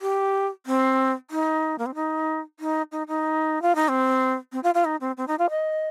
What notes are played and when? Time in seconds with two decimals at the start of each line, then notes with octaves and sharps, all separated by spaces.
0.02 G4
0.66 C4
1.31 D#4
1.79 A#3
1.86 C4
1.95 D#4
2.60 D#4
2.92 D#4
3.08 D#4
3.62 F4
3.75 D#4
3.88 C4
4.52 C4
4.63 F4
4.74 F4
4.85 D#4
5.01 C4
5.17 C4
5.28 D#4
5.39 F4
5.50 D#5